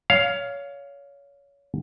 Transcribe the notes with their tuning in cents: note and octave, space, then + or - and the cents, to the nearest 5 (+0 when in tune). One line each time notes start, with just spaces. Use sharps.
C#5 +25 F5 +0